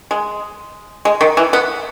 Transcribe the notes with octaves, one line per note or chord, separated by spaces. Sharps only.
G#3
G#3
D#3
E3
B3